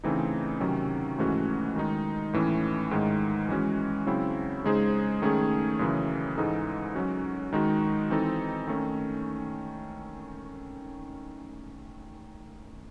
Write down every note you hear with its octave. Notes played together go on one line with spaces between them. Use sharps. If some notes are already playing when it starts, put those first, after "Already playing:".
C#3 E3 A3 C4 D#4
C3 D#3 F#3 C#4
G#2 E3 A3 C#4 F#4
D#3 G#3 D#4
A2 E3 A3 C#4
G#2 D#3 G#3
E3 G#3 C#4 F#4
C#3 F#3 C4 E4
C#3 G#3 D#4 G#4 C5
D#3 A3 C#4 G#4
F#2 C#3 E3
G#2 E3 G#3 D#4 A4
F#3 C#4 F#4
D#3 G#3 D#4 F#4
E3 C4 D#4 A4
D#3 A3 C#4